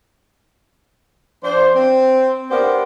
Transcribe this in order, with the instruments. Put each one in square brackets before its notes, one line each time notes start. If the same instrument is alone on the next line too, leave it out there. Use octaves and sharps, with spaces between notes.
[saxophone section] F3 D4 C5
C4
B3 D4 G4 A#4 C5